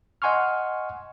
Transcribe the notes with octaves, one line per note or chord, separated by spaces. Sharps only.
D#5 F#5 G#5 C6 C#6 F6